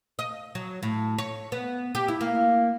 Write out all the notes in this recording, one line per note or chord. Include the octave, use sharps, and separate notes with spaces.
D#5
F#3
A2
C#5
B3
G4
E4
A#3